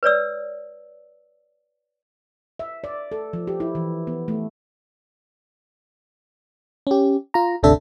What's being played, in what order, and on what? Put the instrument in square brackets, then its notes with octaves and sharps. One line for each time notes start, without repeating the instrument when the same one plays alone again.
[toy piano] B4 C#5 D5 E6
[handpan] E5
D5
A4
F3
G4
E4
E3
B3
A3
[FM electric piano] C#4 G4
F4 A#5
G1 D2 C3 D4 A4 E5